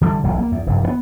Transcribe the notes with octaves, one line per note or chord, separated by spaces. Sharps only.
D3 E3 G3
E1 B1 E2 F#3
A#3
E2
F1 G2
D3 B3